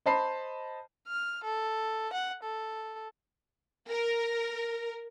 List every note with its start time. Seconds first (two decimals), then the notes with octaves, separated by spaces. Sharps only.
0.06 C5 D#5 A5 B5 C7
1.07 F6
1.44 A4
2.13 F#5
2.44 A4
3.90 A#4